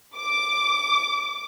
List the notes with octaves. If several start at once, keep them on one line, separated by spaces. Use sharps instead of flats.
D6